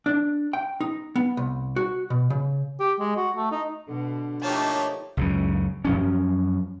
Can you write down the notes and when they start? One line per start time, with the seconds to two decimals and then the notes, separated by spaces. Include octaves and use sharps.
0.06 D4
0.53 G5
0.81 D#4
1.16 B3
1.37 C2
1.76 F#4
2.10 B2
2.30 C#3
2.80 G4
3.00 G#3
3.16 F#4
3.36 A3
3.51 D#4
3.88 B2 D3
4.42 F3 A3 A#3 D#4 G4 C#5 A5
5.17 C#2 F#2 C#3
5.85 F#2 F3 C#4